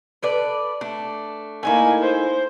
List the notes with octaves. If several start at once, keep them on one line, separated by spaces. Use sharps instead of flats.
A4 B4 D5
A3 D4
A3 A#3 D#4 E4 G#5
C5